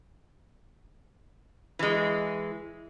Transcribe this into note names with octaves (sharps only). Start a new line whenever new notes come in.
E3 G#3